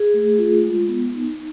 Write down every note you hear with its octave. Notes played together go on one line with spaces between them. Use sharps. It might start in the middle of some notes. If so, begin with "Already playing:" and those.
Already playing: G#4
A3
F4
G#3
B3
D#4